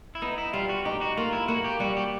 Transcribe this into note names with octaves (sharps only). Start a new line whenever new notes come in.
E4
B3 D#4
E4
G3 F4
F#4
D#4 G4
F#4
A#3 F4
E4
A#3 F#4
G4
G3 F#4
G4